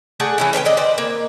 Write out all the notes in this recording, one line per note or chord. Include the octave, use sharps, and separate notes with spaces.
A3 G#4 D5 F#5
E3 C#4 E4
C#4 B4 C#5 G5
D3 D5 D#5
B4 C5 D5
A#3